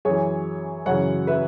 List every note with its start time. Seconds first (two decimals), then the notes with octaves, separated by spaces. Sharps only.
0.05 F#2 E3 G#4 C#5
0.86 F#2 C#3 E3 C#5 F#5
1.27 B4 E5